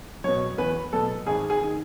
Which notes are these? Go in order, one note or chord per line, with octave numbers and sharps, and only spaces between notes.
B2 F#3 C#5
E2 B4
B2 F#3 A4
G#1 G#4
G#4
D#3